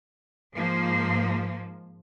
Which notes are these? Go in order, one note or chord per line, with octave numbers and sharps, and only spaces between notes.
G#2 F3 A#3